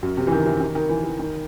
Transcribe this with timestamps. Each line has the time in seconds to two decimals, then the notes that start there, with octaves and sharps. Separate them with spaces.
0.03 F#2
0.17 C3
0.27 E3
0.32 D#3
0.46 E3
0.60 D#3
0.75 D#3
0.89 E3
1.04 E3
1.19 D#3